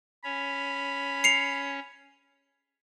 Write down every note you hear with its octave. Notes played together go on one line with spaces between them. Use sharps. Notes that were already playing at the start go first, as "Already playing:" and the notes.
C#4 C#5 B5
C7 C#7 F7